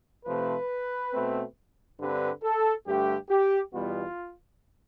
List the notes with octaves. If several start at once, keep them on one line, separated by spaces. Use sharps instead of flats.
C3 F3 A3 B4
B2 A3 C4
G2 D3 G3 C4 B4
A4
G2 D3 A3 G4
G4
E2 B2 G3 B3 F4